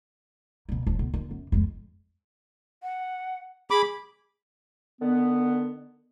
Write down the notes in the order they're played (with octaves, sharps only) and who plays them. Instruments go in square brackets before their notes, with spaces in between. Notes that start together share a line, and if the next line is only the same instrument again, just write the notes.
[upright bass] B2 A#3
D#1 F3
B1
D#2
F#2
F2 G#3
[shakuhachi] F#5
[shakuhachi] G#4 [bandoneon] B5 D6
[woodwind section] D3 D#3 B3